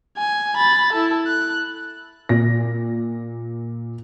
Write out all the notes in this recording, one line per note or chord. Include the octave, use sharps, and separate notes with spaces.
G#5
B5 A6
E4 A4
F#6
A#2 A#6